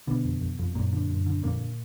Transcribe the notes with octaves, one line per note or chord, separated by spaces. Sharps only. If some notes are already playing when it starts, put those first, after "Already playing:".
B2 D3 B3
F2
F2
F2
F#2 A#2 A#3
D3
F#2
D3
F2 A#2 A#3